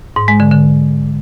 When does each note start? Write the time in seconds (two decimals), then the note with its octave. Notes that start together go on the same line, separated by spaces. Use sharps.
0.16 G#2
0.28 G#3
0.40 D3
0.51 D3